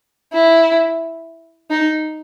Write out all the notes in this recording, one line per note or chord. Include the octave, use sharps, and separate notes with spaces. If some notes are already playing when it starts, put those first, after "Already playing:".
E4
D#4